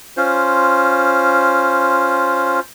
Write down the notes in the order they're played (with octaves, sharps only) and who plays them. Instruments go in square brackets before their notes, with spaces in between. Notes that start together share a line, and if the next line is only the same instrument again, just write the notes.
[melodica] C#4 F4 C5